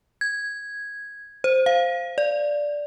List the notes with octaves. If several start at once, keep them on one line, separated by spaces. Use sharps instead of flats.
G#6
C5
F5
D5